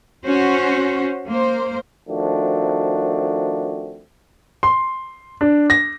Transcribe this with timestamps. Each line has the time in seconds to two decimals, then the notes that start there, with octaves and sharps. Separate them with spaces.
0.24 C#4 F#4 C5
1.27 A#3 C5
2.08 D#3 F3 A3 C4 D4 F#4
4.63 C6
5.41 D4
5.70 A#6